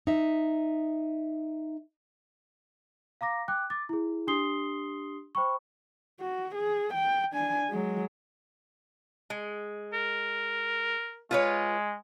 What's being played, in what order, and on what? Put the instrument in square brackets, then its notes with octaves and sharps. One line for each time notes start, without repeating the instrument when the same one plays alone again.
[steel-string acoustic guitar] D#4 E5
[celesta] F5 A#5 D6 A#6
G5 D6 F#6
D6 A6
E4 G#4
D4 G4 C6 D#6 C7 G7
C5 G5 B5 C#6
[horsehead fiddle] F#4
G#4
G5
D4 G#5
F#3 G#3
[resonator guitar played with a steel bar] G#3
[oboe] A#4
[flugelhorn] G#3 [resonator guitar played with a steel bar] F4 B4 C#5